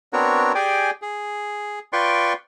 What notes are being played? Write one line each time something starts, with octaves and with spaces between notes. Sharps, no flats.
B3 C4 D4 F#4 A#4 C#5
G4 G#4 D5 G5 G#5
G#4
F4 B4 D5 G5 C6 C#6